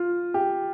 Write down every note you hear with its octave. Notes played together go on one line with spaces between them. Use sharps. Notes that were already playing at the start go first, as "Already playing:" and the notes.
Already playing: F4
G4